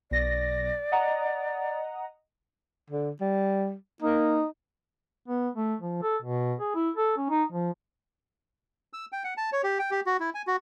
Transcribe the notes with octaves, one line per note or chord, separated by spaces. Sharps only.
B1 D5 A#6
D#5 F#5 A#5
D3
G3
A#3 D#4
B3
A3
F3
A4
B2
G#4
E4
A4
C#4
D#4
F3
E6
G5
F#5
A5
C#5
G4
G5
G4
F#4
E4
G#5
F#4